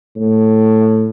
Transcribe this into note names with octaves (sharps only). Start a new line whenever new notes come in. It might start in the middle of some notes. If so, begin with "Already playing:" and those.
A2